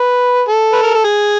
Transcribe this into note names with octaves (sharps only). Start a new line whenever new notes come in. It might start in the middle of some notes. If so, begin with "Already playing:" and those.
Already playing: B4
A4
B4
A#4
A4
G#4